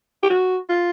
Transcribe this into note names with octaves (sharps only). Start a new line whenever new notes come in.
G4
F#4
F4